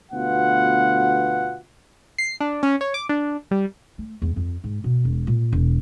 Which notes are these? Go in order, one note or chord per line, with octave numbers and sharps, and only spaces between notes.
D2 B2 B3 F4 F#5
C7
D4
C#4
C#5
D6
D4
G3
A3
E2
F2
G#2
B2
E1
A#2
E1